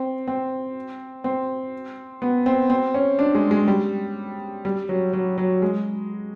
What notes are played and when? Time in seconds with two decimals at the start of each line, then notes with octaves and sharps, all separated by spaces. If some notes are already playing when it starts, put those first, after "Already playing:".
Already playing: C4
0.28 C4
1.24 C4
2.22 B3
2.46 C4
2.70 C4
2.94 C#4
3.19 D4
3.35 G#3
3.51 G#3
3.68 G3
4.65 G3
4.89 F#3
5.13 F#3
5.38 F#3
5.62 G#3